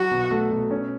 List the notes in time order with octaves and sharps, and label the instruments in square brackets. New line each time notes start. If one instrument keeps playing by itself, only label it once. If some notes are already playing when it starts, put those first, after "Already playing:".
Already playing: [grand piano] F#3 [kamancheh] F#4
[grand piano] B2
A3
B2
C#4